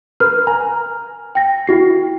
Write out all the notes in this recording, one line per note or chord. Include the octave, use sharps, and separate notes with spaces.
A#4 B4 F6
G#5 A#5
G5 A#6
E4 F#4 C7